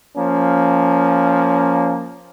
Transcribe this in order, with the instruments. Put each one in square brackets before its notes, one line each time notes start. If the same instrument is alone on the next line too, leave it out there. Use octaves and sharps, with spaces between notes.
[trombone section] F3 A#3 C#4